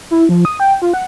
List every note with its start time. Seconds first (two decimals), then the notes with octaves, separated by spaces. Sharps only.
0.11 E4
0.29 F3
0.45 D#6
0.60 G5
0.82 F4
0.94 F#5